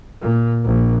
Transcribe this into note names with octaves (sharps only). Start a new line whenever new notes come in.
A#2
A#1